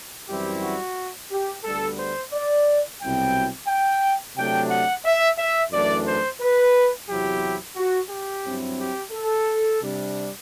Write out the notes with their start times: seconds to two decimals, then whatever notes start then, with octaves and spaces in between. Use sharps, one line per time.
0.29 F#2 E3 G3 C4 E4 G4
0.63 F#4
1.30 G4
1.64 D2 D3 G3 B3 A4
1.99 C5
2.32 D5
3.00 C2 B2 F#3 C4 E4 G5
3.68 G5
4.37 C3 F#3 A3 D4 G5
4.70 F#5
5.05 E5
5.38 E5
5.72 F#2 E3 A3 D4 D5
6.07 C5
6.41 B4
7.09 E2 C3 F#3 C4 E4 G4
7.76 F#4
8.10 G4
8.44 G2 F#3 C4 E4
8.79 G4
9.12 A4
9.81 C3 G3 D4